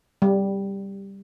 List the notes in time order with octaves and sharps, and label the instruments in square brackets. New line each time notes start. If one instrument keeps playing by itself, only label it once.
[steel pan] G3